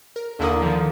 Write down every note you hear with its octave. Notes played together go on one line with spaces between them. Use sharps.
A#4
D#2 D3 A#3 E4 D#6
D#3 F3